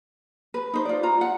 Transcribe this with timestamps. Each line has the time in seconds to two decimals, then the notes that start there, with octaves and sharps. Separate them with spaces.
0.54 B4
0.73 D#4 C5
0.85 F4 D5
1.03 F4 A#5
1.21 F#5